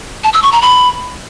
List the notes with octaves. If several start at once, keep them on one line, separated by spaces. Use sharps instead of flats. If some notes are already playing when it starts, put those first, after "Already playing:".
A5
E6
C#6
A#5
B5